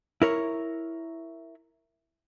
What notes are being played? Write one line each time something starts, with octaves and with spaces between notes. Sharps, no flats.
E4 A#4 C#5